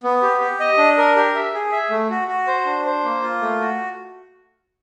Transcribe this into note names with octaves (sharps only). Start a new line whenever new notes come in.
B3
G4
G4
D#5
D4
A#4
G4
E5
G#4
E5
A3
F#4
F#4
C5
D4
C5
A#3
F4
A3
F#4